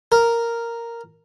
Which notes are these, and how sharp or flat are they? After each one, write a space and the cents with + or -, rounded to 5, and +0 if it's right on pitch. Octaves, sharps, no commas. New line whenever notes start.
A#4 -5